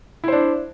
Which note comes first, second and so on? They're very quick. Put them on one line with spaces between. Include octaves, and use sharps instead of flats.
E4 C5 D4